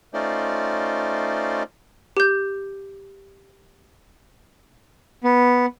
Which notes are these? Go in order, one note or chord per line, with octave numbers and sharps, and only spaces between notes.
A3 C#4 D#4 F4 C5 D5
G4 G6
B3